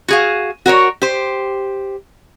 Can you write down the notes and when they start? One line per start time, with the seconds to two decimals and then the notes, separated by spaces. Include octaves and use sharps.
0.08 F#4 G#4 F5
0.66 F#4 A#4 C5 C#5
1.02 G4 C5